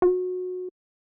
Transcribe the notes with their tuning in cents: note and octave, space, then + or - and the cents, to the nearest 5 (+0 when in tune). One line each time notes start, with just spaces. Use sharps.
F#4 -20